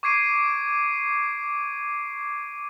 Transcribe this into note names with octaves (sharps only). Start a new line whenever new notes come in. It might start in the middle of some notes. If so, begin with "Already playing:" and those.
C#6 D6 G#6 C7 D7 D#7